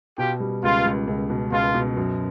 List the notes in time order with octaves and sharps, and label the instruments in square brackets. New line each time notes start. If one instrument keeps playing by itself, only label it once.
[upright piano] B2 [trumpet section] F4 G4
[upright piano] G3
[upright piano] C#2 [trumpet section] F4
[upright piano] C#2
C#2
B2
[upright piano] C#2 [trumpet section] F4
[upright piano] B2
F#2